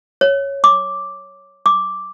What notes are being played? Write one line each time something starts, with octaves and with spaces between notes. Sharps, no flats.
C#5
D6
D6